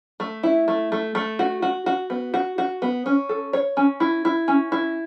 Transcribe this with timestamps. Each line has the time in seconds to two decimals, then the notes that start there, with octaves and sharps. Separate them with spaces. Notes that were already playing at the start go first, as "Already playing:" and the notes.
0.20 A3
0.43 E4
0.68 A3
0.92 A3
1.15 A3
1.39 F#4
1.62 F#4
1.86 F#4
2.10 B3
2.34 F#4
2.58 F#4
2.82 B3
3.06 C#4
3.29 A4
3.53 C#5
3.77 C#4
4.00 E4
4.25 E4
4.48 C#4
4.72 E4